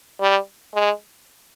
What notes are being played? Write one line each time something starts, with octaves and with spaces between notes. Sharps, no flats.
G3
G#3